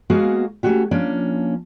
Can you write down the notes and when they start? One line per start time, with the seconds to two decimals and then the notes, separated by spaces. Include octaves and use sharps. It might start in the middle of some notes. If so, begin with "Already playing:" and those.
0.10 G#3 A#3 B3 F#4 G#4 F5
0.63 A3 A#3 C#4 F#4 G4
0.91 F3 A#3 C#4 D4